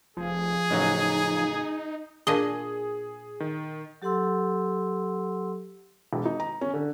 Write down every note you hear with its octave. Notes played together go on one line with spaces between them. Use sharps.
F1 F3 G#4
A1 C#3 F#3 D#4
A#2 D4 G#4 D#5
D#3
F#3 G4 A4 F#5 C6 E6
E1
D#4
A#5
C#4
D3